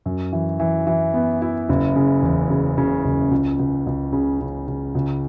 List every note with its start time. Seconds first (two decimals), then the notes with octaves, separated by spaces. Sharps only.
0.06 F#2
0.32 E3
0.60 E3
0.87 E3
1.14 B3
1.42 E4
1.69 F#1
1.96 C#3
2.22 E2
2.50 C#3
2.78 C#3
3.04 F#1
3.31 C#2
3.59 C#2
3.87 C#2
4.13 C#3
4.41 C#3
4.68 C#3
4.95 C#2